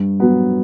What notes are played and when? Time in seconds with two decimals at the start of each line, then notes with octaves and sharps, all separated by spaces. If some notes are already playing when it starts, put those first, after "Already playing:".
Already playing: G2
0.20 F#3 B3